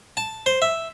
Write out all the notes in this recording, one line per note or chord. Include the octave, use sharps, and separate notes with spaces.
A5
C5
E5